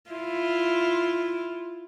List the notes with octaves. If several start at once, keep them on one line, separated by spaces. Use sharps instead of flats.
E4 F4